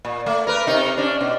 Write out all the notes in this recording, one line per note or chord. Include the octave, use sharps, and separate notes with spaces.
A#2
A3
A#4 B4
C3 D#4
C#4 D4
B2